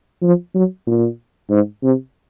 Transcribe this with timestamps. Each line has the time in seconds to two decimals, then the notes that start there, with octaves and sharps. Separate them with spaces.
0.23 F3
0.55 F#3
0.87 A#2
1.50 G#2
1.83 C3